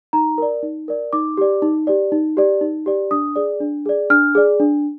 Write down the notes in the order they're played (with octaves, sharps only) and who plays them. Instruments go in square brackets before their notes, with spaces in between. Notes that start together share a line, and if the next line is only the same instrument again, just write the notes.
[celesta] D#4 A#5
A#4 D5
D#4
A#4 D5
D#4 D6
G4 D5
D#4
G4 D5
D#4
G4 D5
D#4
G4 D5
D4 D#6
G#4 D5
D4
G#4 D5
D4 F6
G#4 D5
D4